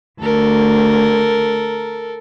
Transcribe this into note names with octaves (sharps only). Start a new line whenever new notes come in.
D2 A4 A#4